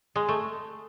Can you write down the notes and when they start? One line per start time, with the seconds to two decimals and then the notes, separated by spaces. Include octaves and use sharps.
0.16 G#3
0.28 A3